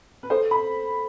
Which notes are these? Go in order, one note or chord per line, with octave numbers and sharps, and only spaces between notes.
B4
A4 C5
B5